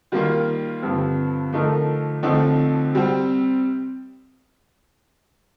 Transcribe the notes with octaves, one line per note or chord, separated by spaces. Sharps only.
D#3 G3 A#3 F4
G2 D3 F3 C4
D3 F3 A3 D#4 A#4
D3 F3 A3 C4 D#4
C3 G3 C4